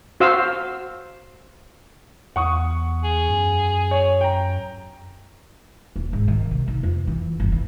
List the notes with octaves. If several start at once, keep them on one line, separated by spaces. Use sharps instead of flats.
F#4 C5 F5 E6
E2 F#5 C#6 D#6
G#4
F#2
C#5
G5 A#5
D#1
G#2
D#3
C3
D#4
F2
E3
G1
E3